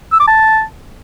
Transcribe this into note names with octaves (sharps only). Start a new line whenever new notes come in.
E6
D6
A5